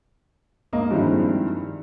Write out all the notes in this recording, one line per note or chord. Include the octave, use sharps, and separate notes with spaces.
G#2 A#3 D#5
G2 D#3 F3 G#3 C4 E4